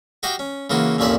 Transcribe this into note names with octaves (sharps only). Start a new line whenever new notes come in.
F#4 G4 D#5 F5 G5
C#4
C#3 E3 A#3 F4 F#4
C2 F2 A#2 C#4 D5 E5